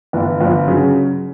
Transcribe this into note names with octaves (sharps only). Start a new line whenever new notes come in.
G1 E3
G1 F3
C#3 F#3